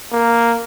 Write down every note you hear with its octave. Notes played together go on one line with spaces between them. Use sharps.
A#3